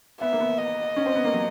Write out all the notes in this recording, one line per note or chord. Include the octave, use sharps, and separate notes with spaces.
B3 E5
A#3
B3
D#5
C#4
C4
B3
A#3
F#3